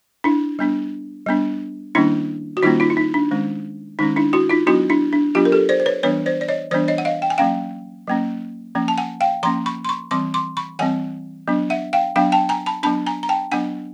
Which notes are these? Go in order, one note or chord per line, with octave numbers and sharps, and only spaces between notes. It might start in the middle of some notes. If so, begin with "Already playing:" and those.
D4 E4
G3 B3 D4
G3 B3 D4
D#3 G3 A#3 C#4 D4 E4
F#4
D#3 G3 A#3 C#4 D#4 F4
D#4 F4
E4
D#4
D4
D#3 G#3 C#4
D#3 G#3 C#4 D#4
D4 E4
E4 F#4
D#4 F4
F#3 B3 D4 E4 F#4
D4 E4
D4
F#3 B3 D4 F4 G4
A#4
G4 A4
C5 D5
C5
B4 C#5
E3 G3 B3 D4 B4 C#5
C5 D5
D5
C#5 D#5
E3 G3 B3 D4 C5 D5
C#5 D#5
F#5
D#5 F5
G5
G#5
F#3 A#3 C#4 F5 G5
F#3 A#3 C#4
F3 A#3 C#4
A5
F#5 G#5
F5 G5
F3 A#3 C#4 A#5 C6
B5 C#6
C6
B5 C#6
E3 G3 C4 C6 D6
C6 D6
B5 C#6
E3 G3 C4 F#5 G#5
F#3 B3 D4
E5 F#5
F5 G5
F#3 B3 D4 F5 G5
G5 A5
G#5 A#5
A5 B5
F#3 B3 D4 A5 B5
G#5 A#5
A#5
G5 A5
F#3 B3 D4 F#5 G#5